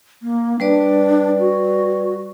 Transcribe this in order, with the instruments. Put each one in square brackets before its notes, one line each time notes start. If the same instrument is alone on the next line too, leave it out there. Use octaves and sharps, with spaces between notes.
[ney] A#3
[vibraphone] G3 B4 D5 [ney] D4
[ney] F#4